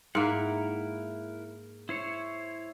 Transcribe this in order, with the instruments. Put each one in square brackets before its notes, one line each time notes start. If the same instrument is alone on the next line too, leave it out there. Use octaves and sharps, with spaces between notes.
[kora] G#2 A#3 [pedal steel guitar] E4 A#4 F#5
[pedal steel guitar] E4 C5 C#5